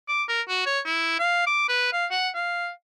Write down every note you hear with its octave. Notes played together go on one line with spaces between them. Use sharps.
D6
A#4
F#4
C#5
E4
F5
D6
B4
F5
F#5
F5